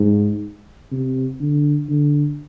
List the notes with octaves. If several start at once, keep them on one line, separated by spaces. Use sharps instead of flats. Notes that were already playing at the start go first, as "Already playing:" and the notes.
Already playing: G#2
C3
D3
D3